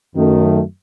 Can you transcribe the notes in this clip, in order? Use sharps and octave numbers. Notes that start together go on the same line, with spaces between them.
F#2 D#3 A3